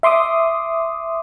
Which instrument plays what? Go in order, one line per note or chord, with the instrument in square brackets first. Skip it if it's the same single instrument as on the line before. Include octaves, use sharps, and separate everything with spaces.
[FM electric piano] E5 C6 D6 D#6